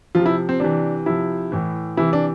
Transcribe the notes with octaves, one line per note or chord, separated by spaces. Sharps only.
C3 F3 F4
E4
C4
C3 E3 D4
C3 F3 E4
A2 E3
C3 E3 E4
D4